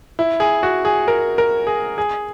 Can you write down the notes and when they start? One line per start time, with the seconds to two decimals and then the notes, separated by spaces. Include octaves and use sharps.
0.19 E4
0.40 G#4
0.63 F#4
0.85 G#4
1.08 A#4
1.38 A#4
1.67 G#4
1.98 G#4